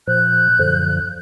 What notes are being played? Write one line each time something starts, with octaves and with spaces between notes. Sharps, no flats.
A#2 F3 F#6 G6
F#2 D3 F3